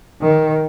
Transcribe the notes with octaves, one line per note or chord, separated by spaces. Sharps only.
D#3